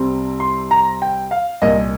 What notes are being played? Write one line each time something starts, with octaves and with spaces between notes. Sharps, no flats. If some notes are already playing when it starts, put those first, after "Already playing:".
Already playing: C2 C3 G3 C4
C6
A#5
G5
F5
C2 A#2 A#3 D#5